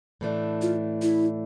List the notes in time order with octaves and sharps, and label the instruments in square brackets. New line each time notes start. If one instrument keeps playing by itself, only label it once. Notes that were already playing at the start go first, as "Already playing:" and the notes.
[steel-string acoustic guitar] A2 E3 A3 D4
[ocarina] F4
E4